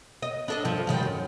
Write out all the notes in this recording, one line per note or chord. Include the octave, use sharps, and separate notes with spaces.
D#5
D4 A4 D#5
G2 F3
G#2 D#3 G3
F#2